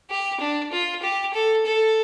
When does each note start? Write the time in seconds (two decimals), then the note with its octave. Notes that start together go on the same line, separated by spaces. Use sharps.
0.10 G4
0.40 D4
0.72 F4
1.03 G4
1.34 A4
1.66 A4